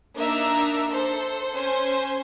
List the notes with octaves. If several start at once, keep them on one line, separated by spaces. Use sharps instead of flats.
A#3 D4 D#4 E5 A#5
A4 C5
C#4 C5 G#5